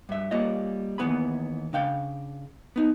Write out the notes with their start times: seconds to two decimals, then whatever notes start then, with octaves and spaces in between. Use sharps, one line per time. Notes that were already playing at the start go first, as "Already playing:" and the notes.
0.09 G2 E5
0.31 G3 A#3 F4 C#5 D#5
0.98 D#2 C3 E3 B3 G#4 B5
1.73 C#3 D4 F5 G5
2.76 B3 D#4